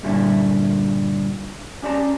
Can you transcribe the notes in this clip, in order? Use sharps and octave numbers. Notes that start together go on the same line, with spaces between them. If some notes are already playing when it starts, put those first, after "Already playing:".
G2 A#2 D3 G3 E4
C#4 G4 D5 A5 A#5